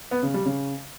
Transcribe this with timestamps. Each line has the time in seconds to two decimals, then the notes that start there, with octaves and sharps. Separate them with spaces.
0.11 B3
0.23 C#3
0.34 G3
0.46 C#3